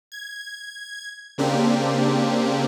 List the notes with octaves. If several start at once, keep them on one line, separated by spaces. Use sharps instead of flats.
G#6
C#3 A#3 C4 D4 G4